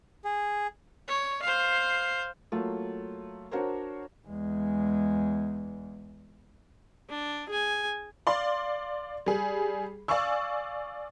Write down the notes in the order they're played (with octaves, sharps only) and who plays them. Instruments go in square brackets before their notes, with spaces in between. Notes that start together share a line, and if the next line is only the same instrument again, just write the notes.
[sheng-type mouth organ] G#4
[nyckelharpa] C#5
C5 F5
[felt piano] F#3 A3 A#3 F4
D4 F#4 A#4 C5 C#5
[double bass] E2 G#3
[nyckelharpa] D4
G#4 G#5
[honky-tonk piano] D5 F5 C6
G3 G#4
D5 F5 G#5 C#6 E6